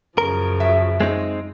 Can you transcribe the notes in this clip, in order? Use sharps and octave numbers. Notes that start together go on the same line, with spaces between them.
F#2 C#3 F3 A#4
F#3 E5
G#3 C4 D#4